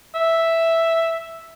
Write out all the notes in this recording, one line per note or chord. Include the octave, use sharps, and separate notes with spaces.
E5